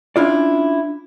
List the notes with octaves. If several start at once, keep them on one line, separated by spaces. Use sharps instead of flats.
C#4 D4 E4 F4 D5